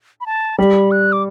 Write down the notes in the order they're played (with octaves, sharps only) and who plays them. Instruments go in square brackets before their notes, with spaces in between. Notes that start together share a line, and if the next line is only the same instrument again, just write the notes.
[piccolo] B5
A5
[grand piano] G3 [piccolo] B5
[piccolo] F#6
D6